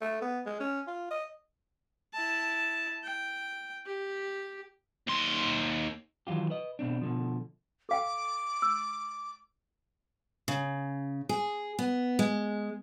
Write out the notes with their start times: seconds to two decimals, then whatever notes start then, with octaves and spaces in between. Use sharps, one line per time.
0.02 A3
0.22 B3
0.46 G#3
0.60 C#4
0.87 F4
1.11 D#5
2.13 E4 A5
3.03 G5
3.86 G4
5.07 D#2 C6
6.27 D#3 E3 F#3 F4 G4
6.50 B4 D#5
6.79 B2 C4 D4
7.01 B2 D3 F3
7.89 A4 F5 G5 D6
8.62 E6
10.48 C#3
11.29 G#4
11.79 B3
12.19 G#3